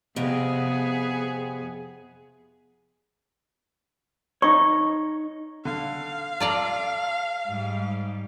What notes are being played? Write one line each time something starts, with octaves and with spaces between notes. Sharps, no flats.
F2 C3 B3 G#4
D#4 C#5 C#6
D3 F5
F4 A4 D5 A#5
G#2 G3